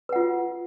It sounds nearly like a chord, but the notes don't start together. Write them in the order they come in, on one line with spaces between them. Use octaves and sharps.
B4 F#5 F4